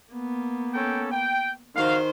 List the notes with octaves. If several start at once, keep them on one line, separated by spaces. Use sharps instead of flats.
A#3 B3
C#4 A4 G5
G5
D#3 F#4 C5 F5